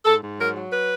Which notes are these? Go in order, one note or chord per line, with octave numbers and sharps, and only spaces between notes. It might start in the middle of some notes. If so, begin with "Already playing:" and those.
G#2 A4
G#2
F#3 A#4
F#3
B4